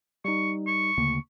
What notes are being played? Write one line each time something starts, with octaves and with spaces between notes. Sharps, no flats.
G3 D#4 C#6
C#6
D2 C#3 A#3